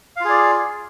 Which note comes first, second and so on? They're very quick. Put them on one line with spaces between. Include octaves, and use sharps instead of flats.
F5 F4 G#4 D5